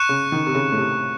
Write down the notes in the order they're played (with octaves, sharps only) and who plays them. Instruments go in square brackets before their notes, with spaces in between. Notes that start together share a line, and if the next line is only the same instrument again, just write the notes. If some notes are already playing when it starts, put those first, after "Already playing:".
Already playing: [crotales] C#6 F#6 C#7 E7
[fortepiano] C#3
D#3
C3
C#3
A2
C3